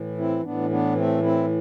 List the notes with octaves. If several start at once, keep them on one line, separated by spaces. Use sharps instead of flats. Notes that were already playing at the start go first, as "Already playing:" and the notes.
Already playing: A2 E3
C4 E4
A2 E3 B3 D4
B3 D4
A3 C4
C4 E4